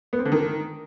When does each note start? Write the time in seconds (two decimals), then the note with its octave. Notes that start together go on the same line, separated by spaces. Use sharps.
0.13 B3
0.19 C4
0.25 D3
0.32 D#3